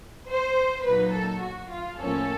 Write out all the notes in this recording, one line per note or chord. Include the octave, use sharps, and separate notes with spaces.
C5
A#2 F#3 A#3 D#4 B4
A4
F#4
F4
A2 F3 A#3 C#4 A4